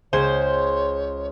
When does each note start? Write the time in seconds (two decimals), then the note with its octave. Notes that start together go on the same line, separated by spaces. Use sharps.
0.13 C#2 G#4 C5 C#5 E7